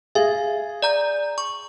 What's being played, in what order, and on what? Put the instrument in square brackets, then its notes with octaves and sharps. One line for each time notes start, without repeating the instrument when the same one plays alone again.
[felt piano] G#4 [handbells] E5 F5
[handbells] D5 A#5 G6
C#6